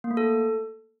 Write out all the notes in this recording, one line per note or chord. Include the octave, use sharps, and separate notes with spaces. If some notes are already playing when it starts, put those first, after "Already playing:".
A#3
A3
A4